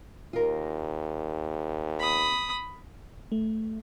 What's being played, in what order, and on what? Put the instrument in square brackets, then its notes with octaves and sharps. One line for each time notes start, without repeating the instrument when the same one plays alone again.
[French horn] D#2 [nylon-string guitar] F4 A#4
[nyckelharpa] B5 D#6
[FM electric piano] A3